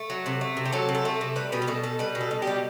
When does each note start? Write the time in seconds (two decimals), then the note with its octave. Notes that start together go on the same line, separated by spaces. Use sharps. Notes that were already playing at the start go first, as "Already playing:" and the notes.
Already playing: A3
0.10 F#3
0.26 C3
0.41 A3
0.57 C3
0.65 G4
0.73 F#3 A4
0.89 C3
0.95 A4
1.05 A3
1.21 C3
1.36 G3 B4
1.52 B2 B4
1.62 G4
1.67 B2 A4
1.84 G3 A4
1.99 G3 B4
2.15 B2
2.21 A4
2.31 B2
2.42 G4
2.47 G3